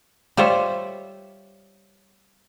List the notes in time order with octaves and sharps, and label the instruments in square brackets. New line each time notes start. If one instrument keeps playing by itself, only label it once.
[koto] G3 F4 C5 C#5 E5